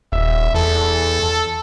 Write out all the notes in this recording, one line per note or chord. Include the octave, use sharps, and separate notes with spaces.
D#1 E5
E2 A4